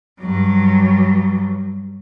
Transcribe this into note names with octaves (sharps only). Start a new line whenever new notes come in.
G2 F#3